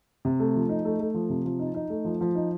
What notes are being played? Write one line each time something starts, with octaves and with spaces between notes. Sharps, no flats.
C3
A3
F3
D#4
A3
A3
F3
C3
F3
D#4
D#4
A3
F3
F3
D#4